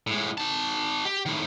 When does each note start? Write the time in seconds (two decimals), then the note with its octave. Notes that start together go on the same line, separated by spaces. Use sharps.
0.07 A2 G#3
0.38 D#4 A5
1.05 G4
1.26 A2 D#3